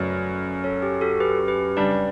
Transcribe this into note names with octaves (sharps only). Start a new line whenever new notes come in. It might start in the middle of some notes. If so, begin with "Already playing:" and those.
Already playing: F#2 C#3 F#3 A3 B4 D5
A4 C#5
G4
F#4 A4
G4 B4
G4 B4
C#3 G3 D4 B4 D5